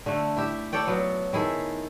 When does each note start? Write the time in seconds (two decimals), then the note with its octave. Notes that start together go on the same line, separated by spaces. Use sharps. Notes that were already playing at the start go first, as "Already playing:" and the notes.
0.06 D3 A3
0.37 E4 G4 E5
0.73 A4 C#5 D5 G5
0.87 F#3 B3
1.33 D#3 E4 G#4 A4